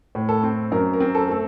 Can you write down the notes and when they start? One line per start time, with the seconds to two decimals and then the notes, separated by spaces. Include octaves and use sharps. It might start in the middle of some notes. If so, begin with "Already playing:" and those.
0.15 A2
0.29 A4
0.43 C4
0.72 F#2 A#4
0.93 A#4
1.00 C4
1.15 A4
1.29 A3 A4